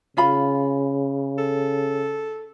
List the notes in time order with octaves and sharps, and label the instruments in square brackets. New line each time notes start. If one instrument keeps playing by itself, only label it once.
[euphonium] C#3 [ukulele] C#4 F4 B5
[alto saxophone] A4